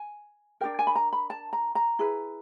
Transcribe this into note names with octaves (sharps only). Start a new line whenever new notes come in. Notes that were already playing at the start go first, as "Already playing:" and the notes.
Already playing: G#5
D4 G4 A#4 G5
G#5
B5
A#5
B5
A5
A#5
A#5
E4 G#4 B4